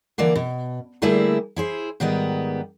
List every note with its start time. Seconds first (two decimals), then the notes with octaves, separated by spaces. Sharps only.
0.18 D3 E3 A#3 D5
0.36 B2
1.02 D3 G3 A3 A#3 E4 G#4
1.56 E4 G#4 C5
2.00 G#2 D#3 G3 B3